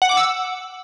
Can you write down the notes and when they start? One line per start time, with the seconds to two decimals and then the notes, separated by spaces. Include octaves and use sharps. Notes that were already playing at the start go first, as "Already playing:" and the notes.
0.02 F#5
0.09 D6
0.17 E6